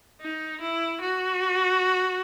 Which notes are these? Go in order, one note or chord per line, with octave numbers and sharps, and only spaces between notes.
D#4
E4
F#4